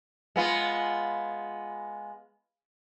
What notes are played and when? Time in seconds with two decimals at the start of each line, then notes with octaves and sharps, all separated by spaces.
0.36 G#3 B3 F4